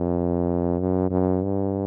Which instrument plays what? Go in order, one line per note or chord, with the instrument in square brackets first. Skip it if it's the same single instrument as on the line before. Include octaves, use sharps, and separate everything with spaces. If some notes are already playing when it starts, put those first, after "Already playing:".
Already playing: [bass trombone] F2
F#2
F#2
G2